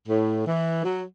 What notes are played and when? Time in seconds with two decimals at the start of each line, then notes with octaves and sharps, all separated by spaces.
0.08 A2
0.47 E3
0.84 F#3